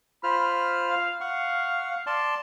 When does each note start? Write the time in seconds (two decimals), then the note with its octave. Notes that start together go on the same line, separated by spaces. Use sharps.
0.24 F4 C5 B5 F6
0.89 F5
1.21 F5 F#5 C#6
2.07 D5 A5 C6